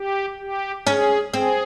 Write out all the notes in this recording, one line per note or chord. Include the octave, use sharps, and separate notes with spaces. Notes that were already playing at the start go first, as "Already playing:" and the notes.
Already playing: G4
G4
C#4 G#4
C4 G#4